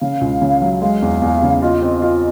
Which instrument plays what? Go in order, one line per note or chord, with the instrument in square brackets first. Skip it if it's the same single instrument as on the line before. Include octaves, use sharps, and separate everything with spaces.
[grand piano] C#3 [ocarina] F5
[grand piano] C#2
C#3
F#3
[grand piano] G#3 [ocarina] F5
[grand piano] E2
E2
C#3
[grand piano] F4 [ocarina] D#5
[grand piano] C4
[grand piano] F4 [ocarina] D#5